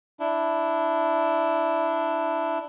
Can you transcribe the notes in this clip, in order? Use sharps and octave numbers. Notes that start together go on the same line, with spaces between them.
D4 E4